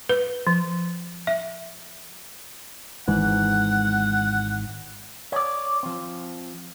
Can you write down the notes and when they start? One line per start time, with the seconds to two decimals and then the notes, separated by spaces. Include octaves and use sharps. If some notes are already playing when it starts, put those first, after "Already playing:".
0.09 B4
0.47 F3
1.27 E5
3.08 G#1 G#2 E3 F#5
5.32 C#5 D5
5.83 F3 C4